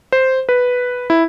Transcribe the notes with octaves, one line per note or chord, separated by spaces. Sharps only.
C5
B4
E4